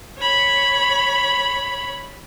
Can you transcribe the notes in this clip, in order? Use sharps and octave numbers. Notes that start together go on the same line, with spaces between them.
C#5 B5